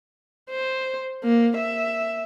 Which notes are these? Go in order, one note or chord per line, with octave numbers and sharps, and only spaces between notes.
C5
A#3
E5